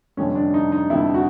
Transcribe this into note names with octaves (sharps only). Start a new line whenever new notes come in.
F1 F2 D3 G3 C#4
D4
D#4
D#4
F1 F2 D3 G3 E4
F#4